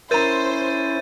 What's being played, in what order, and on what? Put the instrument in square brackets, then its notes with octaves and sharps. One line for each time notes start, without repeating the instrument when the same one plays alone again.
[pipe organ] C#4 E4 [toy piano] A#4 A#5 [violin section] C5 [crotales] G6 A6 D#7